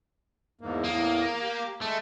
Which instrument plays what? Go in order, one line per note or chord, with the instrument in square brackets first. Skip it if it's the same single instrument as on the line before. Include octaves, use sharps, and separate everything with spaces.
[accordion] E2 G#2 A#3
[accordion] E2 A2 D#6 [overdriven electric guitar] A#3
[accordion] G4
[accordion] G#3 [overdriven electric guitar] A3